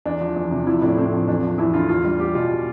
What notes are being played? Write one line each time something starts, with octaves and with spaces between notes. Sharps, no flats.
E2 D4
F3
E2
C3
F3 E4
A2 D4
A2 C4
F3
E2 D4
F3
E2 E4
D3 F4
E2 F4
G3
E2 G4
B2 F4